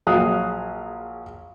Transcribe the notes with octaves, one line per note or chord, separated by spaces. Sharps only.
A#1 F#3 G#4 F5 D#6 F#6